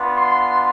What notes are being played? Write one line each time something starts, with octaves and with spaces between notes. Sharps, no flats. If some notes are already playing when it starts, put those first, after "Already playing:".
Already playing: B3 D4 F4
C6